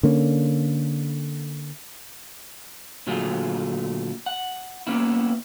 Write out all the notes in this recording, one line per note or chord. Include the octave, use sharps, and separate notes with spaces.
D3 A#3 C#4
A#2 D3 F#3 A3 F4 G#4
F#5
A#3 B3 C#4 E4